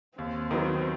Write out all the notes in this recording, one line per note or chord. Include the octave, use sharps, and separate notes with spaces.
D#2 C4
D#3 F#3 B3